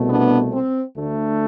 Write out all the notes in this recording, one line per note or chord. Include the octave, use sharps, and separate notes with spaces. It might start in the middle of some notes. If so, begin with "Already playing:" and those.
Already playing: C2 B2 A3
B3 D4
C4
D2 D3 A3